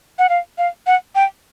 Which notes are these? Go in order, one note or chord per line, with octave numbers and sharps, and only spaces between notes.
F#5
F5
F5
F#5
G5